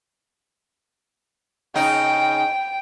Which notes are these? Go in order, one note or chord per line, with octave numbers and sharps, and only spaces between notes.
C#3 D#4 G5